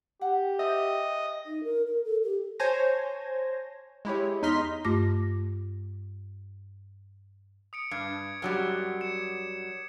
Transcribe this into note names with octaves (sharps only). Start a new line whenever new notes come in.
G4 F#5
C5 D#5 E5 G#5
D#4
A#4
A#4
A4
G4
C5 C#5 G#5 A5 G#6 A#6
G#3 E4 G4 C#5
E2 D#4 D#5 C6 F6 B6
G2 A3 F4 D6 A#6
D#6 C#7 D7
G2 D6 G#6 C7
F#2 F#3 G3
G#6 C#7 E7